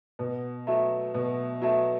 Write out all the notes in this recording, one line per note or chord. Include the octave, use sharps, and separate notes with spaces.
B2
F#3 A3
B2
F#3 A3